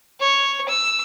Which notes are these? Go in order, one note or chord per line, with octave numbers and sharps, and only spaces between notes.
C#5
E6